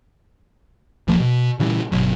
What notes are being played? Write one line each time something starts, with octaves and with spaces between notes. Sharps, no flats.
D1 E3 F3 A#3
B2
A#2 C#3 E3 G3
G1 B2 F#3